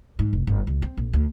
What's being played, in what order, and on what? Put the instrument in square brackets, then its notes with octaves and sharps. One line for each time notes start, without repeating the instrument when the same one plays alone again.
[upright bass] G#2
F1
G1
C#2
C4
A#1
D2